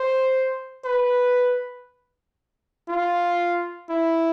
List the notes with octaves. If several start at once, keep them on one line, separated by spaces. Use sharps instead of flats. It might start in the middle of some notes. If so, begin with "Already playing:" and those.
Already playing: C5
B4
F4
E4